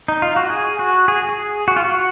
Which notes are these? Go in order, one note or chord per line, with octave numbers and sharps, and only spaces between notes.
D#4
F4
F#4
G#4
F#4
G#4
G#4
F#4
F4
F#4